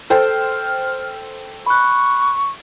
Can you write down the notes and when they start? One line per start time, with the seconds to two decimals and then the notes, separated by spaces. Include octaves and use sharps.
0.10 A4 C5 G5 F6
1.66 B5 C#6 F#6